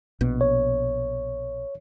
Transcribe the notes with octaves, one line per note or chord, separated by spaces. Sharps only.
A#1 B2
C#5